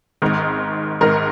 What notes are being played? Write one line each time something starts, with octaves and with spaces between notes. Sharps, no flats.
G#1 G#2 D#3
G#1 G#2 D#3 A#4